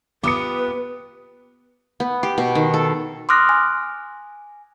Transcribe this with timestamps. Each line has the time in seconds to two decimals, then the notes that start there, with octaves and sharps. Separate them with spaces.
0.23 B3 F4 G4 B4 D6 D#6 C#7
2.00 B3
2.23 G4
2.38 B2
2.55 D#3
2.74 A4
3.29 C6 D6 D#6 F6 F#6 A#6
3.49 G#5